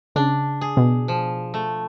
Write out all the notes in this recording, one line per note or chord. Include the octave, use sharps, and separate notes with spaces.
C#3 D4
G#4
B2
F3
A3